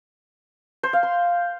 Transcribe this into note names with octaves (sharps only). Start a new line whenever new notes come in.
C5
F5
C6